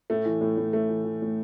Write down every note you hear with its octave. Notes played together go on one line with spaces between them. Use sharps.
A2 A3
E3
A2
A2
A2 A3
E3
E3
A2